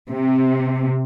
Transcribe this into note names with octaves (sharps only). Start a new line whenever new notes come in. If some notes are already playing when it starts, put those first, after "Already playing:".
C3